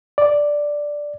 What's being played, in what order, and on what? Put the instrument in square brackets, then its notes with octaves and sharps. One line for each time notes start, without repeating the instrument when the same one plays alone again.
[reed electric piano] D5